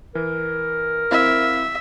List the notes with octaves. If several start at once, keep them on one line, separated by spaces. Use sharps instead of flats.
E3 A#4
C4 E4 E5 F5